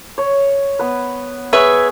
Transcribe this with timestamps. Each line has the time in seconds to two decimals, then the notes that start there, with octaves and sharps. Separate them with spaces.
0.18 C#5
0.79 B3 B4
1.53 G#4 B4 C#5 E5